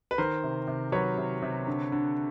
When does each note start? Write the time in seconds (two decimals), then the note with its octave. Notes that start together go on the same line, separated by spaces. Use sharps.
0.11 B4
0.18 D#3 A#4 C5
0.44 C3
0.67 C3
0.92 F#3 B4 C#5
1.18 C3
1.42 C3
1.67 D3
1.92 D3